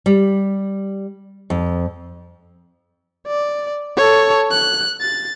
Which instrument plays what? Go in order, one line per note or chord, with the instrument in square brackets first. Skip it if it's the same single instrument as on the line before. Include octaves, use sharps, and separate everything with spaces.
[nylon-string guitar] G3
F2
[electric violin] D5
A4 C#5
F#6
A6